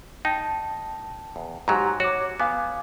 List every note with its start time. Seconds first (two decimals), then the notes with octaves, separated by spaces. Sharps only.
0.25 D#4 G5 A5
1.36 E2
1.68 G#2 F#3 G4 A#5
2.00 F#4 C#5 D6
2.40 B3 F5 G#5 D6